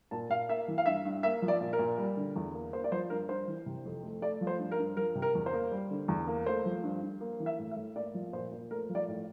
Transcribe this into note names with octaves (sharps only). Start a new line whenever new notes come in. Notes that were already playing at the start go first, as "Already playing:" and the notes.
A#2 A5
A#2 F5
A#3 E5
E3
F5
G2 E5
G2
A#3 E5
F3
D5
A#2
A#4
A#2
G3
D3
E2
A#3
A#3 C5
D5
F3 C5
G2 A#4
G2 C5
E3
C3
F2
A3
A3 D5
F3
C5
G2
A#4
G2
F3 A#4
C3
A#4
E2
C5
A#3
G3
D3
E2
A#3
A3 C5
F3
G2
G2
A#3
E3
E5
A2
E5
A2
A#3 D5
F3
A#2 C5
A#2
A3 A#4
F3
D5
A2